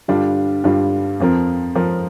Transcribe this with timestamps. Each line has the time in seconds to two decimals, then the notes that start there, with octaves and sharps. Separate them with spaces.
0.08 G2 D3 G3 D4 F4
0.64 G2 D3 G3 D4 F4
1.20 F2 F3 C4 A#4
1.75 F2 F3 C4 A#4